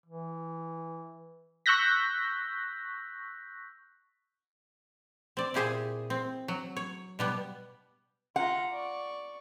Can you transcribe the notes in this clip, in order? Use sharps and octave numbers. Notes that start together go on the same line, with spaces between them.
E3
C#6 E6 F#6 G6 A#6 B6
C4 D5
A#2 E4 G4 G#4 C5 G#5
C4
F#3
C#5
B2 G3 B3
F4 F#5 A#5
D5 C#6